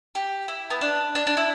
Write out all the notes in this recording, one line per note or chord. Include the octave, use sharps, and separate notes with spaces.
G4
E4
B3
D4
D4
D4
E4